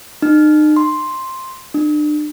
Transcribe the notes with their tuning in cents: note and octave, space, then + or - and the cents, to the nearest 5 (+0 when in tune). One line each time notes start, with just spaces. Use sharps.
D#4 -40
C6 +5
D4 +35